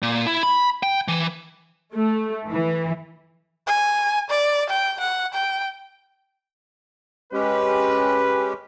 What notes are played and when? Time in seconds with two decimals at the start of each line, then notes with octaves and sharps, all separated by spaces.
0.02 A#2
0.26 E4
0.43 B5
0.83 G5
1.08 E3
1.94 A3
2.49 E3
3.67 G#5
4.30 D5
4.70 G5
5.00 F#5
5.34 G5
7.33 G#3 C#4 G4 B4